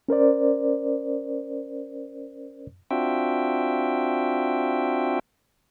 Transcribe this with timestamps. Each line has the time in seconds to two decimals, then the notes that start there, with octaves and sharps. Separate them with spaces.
0.09 C#4 A#4 C5 D5
2.91 C4 D4 F4 F#4 E5 G5